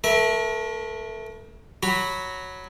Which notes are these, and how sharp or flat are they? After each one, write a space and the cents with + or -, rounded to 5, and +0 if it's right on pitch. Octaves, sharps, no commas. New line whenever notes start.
A3 +0 A#4 +40 E5 +0
F#3 +0 F#4 +0 B5 +0